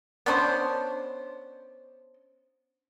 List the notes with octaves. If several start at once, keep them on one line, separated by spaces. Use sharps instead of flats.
B3 C#4 D4 C5